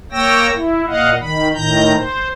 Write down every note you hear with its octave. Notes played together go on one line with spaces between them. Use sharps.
A#3 C#5 G5 E6 A#6
E4
A#2 D#5 F5 F#5
D#3 B5
A2 D#3 A#5 G6
C5